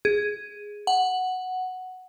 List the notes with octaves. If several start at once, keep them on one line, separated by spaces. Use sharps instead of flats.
G#4
F#5